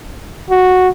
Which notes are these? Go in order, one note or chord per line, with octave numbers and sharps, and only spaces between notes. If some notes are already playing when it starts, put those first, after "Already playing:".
F#4